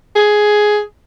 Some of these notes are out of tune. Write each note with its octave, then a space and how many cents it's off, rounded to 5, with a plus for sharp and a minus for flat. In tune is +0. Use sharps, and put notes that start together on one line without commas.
G#4 +10